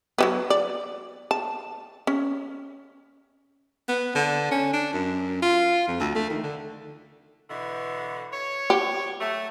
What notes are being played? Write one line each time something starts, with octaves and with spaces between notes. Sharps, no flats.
F#3 G3 B3
D5
A5
C#4
B3
D3
C#4
D4
F#2
F4
F2
D2
A3
D#3
D3
B2 D3 E3
C#5
G4
F#3 A3